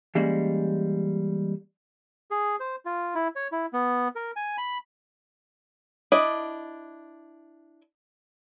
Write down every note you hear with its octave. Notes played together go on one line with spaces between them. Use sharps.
E3 G3 G#3 A#3 C#4
G#4
C5
F4
E4
C#5
E4
B3
A#4
G#5
B5
D4 E4 D5 D#5